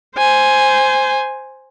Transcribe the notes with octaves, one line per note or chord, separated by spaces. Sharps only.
C5 G#5